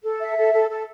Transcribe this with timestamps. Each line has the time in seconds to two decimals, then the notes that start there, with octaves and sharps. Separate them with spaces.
0.02 A4
0.20 E5
0.36 A4
0.53 A4
0.69 A4